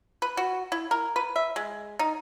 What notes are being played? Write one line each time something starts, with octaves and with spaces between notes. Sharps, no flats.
B4
F#4
E4
A#4
B4
E5
G#3
D#4